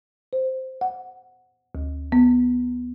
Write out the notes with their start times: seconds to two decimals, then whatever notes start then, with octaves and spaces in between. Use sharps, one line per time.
0.33 C5
0.81 F#5
1.75 D2
2.12 B3